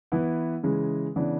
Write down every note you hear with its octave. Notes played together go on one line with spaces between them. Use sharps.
E3 B3 E4
C#3 E3 G#3
C#3 E3 B3 D4